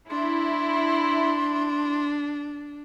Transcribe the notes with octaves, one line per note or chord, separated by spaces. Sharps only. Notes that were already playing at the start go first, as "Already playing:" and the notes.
D4 E4 C6